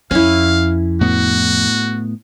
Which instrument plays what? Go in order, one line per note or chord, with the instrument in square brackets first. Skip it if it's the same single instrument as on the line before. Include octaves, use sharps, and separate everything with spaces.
[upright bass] F2 [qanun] C#4 E4 [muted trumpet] F5
[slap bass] A2 B3 [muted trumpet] F#4